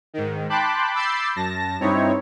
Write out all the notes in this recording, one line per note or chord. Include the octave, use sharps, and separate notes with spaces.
G#2 D#3
G5 A5 B5 C6 D6 F#6
B5 D6 E6 G6 A6 C7
F#2 A5 A#6
G2 C4 D#4 E4 C#5